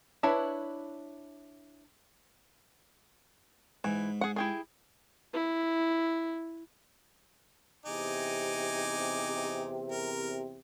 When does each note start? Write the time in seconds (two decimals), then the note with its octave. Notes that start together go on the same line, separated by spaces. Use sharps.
0.23 D4 E4 B4 C#5
3.84 G#2 E3
4.21 G#4 F#5
4.36 E4 G4 G#4
5.34 E4
7.86 E2 C3 D#4 G#5 D6
9.91 A#4